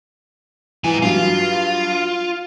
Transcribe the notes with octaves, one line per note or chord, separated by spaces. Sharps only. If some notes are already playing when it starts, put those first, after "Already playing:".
G#2 E3 G#5
G2 F#3 F4